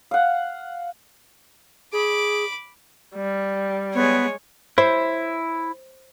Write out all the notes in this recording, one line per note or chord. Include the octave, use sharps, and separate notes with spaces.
F5 F#5
G#4 B5 D6
G3
G#3 B3 C#5
E4 C5